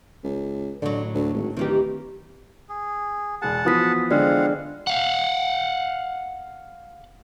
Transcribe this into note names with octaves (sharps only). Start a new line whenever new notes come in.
C#2
A2 D3 F#3
D2
G#1
D1 D#3 E3 G4
G#4
E1 G#4 F#5 A5
E3 F3 B3 F#4 D#6 B6
D3 G#3 C4 D5 F5 F#5
F5 F#5